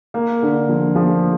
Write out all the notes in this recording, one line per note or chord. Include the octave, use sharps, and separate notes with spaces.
A#3
D3
F3
F3